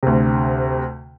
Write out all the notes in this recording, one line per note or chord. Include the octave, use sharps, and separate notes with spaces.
D2 C3